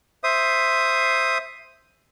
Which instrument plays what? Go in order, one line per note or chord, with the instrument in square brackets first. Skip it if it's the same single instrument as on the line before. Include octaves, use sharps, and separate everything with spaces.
[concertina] C5 E5 D#6